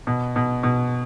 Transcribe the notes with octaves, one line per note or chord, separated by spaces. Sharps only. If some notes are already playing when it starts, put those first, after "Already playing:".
B2
B2
B2